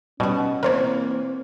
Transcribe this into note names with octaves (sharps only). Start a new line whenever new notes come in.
B2 G3 C#4 D#4 F#4
E3 A#3 C4 F4 A#4 C5 C#5